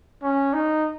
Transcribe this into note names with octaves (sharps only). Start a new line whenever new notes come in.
C#4
D#4